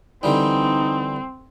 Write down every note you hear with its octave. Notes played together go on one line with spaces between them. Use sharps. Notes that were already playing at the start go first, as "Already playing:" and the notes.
D3 E3 G3 C4 D#4